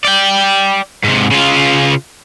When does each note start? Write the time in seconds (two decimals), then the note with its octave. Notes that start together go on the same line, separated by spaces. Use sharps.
0.05 D5 G5
1.04 G#2 C3
1.31 C#3 F4